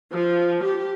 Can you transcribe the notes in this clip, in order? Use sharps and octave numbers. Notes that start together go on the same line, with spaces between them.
F3
G4